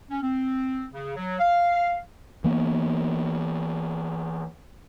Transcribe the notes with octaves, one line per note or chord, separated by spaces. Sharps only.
C#4
C4
C#3
F#3
F5
E3 A#3 B3